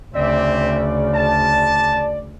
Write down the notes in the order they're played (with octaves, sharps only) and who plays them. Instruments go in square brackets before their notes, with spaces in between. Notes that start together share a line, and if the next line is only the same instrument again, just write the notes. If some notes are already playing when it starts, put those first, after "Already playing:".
[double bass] D2 C#3 [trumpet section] C4 E5 [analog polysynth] D5
[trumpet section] A5